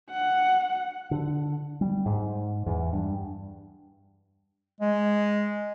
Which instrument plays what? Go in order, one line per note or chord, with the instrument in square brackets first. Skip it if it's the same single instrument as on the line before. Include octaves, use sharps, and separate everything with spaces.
[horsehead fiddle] F#5
[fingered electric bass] D3
G3
G#2
E2
G2
[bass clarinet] G#3